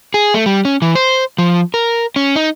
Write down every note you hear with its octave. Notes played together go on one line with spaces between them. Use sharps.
G#4
A3
G3
C#4
E3
C5
F3
A#4
C#4
D#4